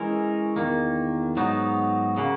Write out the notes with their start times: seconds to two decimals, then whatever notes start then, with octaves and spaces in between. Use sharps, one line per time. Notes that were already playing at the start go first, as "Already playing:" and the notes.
Already playing: E3 G#3 C#4 E4 A#4
0.56 E2 D#3 A#3
1.37 G#2 F#3 B3 D#4
2.17 C#3 F#3 A#3